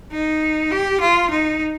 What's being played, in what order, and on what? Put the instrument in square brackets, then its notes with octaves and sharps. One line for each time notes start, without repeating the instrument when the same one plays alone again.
[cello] D#4
G4
F4
D#4